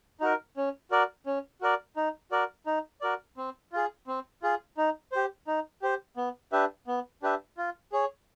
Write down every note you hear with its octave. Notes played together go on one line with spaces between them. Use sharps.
D#4 F#4 A#4
C#4
F#4 A#4 D5
C#4
F#4 A#4 D5
D#4
F#4 A#4 D5
D#4
F#4 A#4 D5
C4
F4 G#4
C4
F4 G#4
D#4
G4 C5
D#4
G4 C5
B3
D4 G4 B4 E5
B3
D4 G4 B4 E5
F4
G#4 C#5